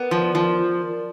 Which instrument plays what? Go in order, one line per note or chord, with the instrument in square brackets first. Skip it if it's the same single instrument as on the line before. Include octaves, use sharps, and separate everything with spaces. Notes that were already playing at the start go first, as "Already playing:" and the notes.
Already playing: [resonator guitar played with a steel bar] B3 [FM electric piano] A#4 D5
[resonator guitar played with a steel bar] F3
F3